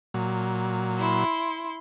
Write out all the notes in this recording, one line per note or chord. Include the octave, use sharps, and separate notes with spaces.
A#2 F#3
E4 C6